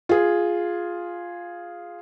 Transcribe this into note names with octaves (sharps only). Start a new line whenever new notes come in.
F4 G#4